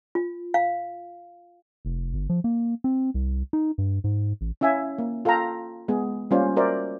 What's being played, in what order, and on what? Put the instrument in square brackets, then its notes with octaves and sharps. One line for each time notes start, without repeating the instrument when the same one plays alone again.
[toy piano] F4
F5
[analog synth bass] F1
G1
F3
A#3
C4
C2
D#4
G2
G#2
A1
[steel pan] C#4 E4 E5 F5 G#5
A#3
F4 A4 F5 G5 A#5
G#3 B3 G#4
G3 A#3 C#4 F4 C5 D5
F#4 A#4 C5 D5 E5